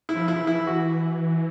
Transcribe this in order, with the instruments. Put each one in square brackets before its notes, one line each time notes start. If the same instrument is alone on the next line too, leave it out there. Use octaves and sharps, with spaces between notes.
[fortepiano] E4
[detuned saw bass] F3
[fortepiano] E4
[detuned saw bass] E3
[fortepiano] E4
F#4